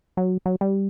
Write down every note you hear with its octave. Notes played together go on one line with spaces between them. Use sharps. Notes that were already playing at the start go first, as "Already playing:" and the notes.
F#3
F#3
G3